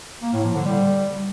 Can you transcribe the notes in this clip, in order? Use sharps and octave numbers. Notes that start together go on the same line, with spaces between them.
A#3
A2
F3
D3
G3